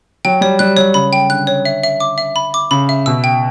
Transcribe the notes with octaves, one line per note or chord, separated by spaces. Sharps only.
F#3 G5
G3 C#5
G3 F#6
F#3 C#5
C#3 B5
G5
D3 F#6
C#5
E5
E5
D6
E5
B5
D6
C#3 B5
E5
B2 E6
G5